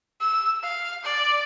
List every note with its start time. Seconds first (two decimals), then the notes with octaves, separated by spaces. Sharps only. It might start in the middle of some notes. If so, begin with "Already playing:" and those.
0.21 E6
0.63 F5
1.03 D5